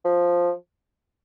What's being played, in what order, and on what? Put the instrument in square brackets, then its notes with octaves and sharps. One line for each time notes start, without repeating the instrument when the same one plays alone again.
[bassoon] F3